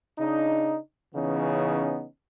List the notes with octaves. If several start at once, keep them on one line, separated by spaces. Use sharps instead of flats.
C#3 D4 D#4
C#3 E3 B3 C#4 D#4